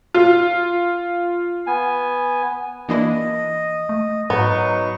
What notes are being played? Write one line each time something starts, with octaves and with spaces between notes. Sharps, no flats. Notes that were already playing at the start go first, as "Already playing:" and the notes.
F4
B3 G#5
E3 A#3 D4 E4 D#5
A3
G#2 F#3 B3 D#4 C#6